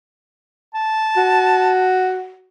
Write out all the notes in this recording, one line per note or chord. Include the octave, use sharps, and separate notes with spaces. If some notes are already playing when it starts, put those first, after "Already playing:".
A5
F#4